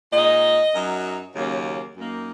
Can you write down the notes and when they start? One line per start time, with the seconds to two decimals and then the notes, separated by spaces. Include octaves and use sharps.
0.12 A#2 G#3 D#4 D#5
0.74 F#2 F#3 D#4
1.35 D#2 C#3 F#3 A#3 C#4
1.97 F#2 D#3 A#3 D#4